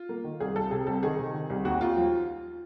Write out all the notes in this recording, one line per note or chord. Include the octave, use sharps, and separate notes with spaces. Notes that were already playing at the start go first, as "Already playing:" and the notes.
Already playing: F4
A#3
D#3
C2 G#4
C2 A4
C3 G#4
C2 A4
D#3 G#4
C3
D#3
C2
D#2 F#4
D#2 F4
F3